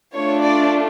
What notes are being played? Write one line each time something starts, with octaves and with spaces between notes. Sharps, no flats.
A3 D4 F4 C#5
D5